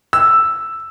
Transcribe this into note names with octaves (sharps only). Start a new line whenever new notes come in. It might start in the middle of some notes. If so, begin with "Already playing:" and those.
E6